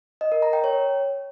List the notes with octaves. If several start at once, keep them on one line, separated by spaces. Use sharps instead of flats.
D#5
A#4
A#5
G5
C#5